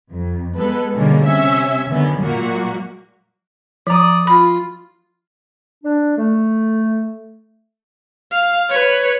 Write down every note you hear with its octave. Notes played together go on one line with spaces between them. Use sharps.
F2
G#3 B3 A4 B4
B2 D3 G3 G#3 A#3 C#4
C3 C#4 E5 E6
D3 D#3 F#3 B3 C#4
A#2 F#3 G#3 A#3 F#4
F3 D5 A#5 D#6
F4 B5
D4
A3
F5
B4 C#5